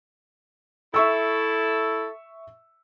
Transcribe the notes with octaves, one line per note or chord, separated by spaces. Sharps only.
E4 A4 E5 C#6 E6